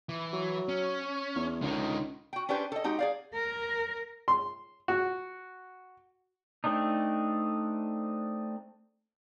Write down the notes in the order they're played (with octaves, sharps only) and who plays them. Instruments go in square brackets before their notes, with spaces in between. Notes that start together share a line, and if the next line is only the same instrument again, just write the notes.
[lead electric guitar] E3
[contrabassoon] F#3
[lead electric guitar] C#4
[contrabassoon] E2
[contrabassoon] C#2 [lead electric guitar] D3 D#4
[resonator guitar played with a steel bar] F#4 G5
C#4 D4 G4 B4 C5
A4 D#5
G#3 D#4 F#4 G4
G#4 D5 F5
[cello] A#4
[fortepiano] C6
F#4
[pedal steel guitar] A3 C4 D4 D#4